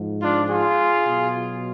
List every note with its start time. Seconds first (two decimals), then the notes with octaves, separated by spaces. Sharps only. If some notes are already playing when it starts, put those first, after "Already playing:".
Already playing: G#2 F3
0.21 D4 F4
0.50 F4 G#4
1.06 B2 F#3